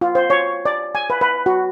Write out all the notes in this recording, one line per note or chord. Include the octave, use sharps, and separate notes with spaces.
F4
C5
C#5
D5
G#5
B4
B4
F#4